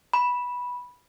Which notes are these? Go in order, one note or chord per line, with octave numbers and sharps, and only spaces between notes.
B5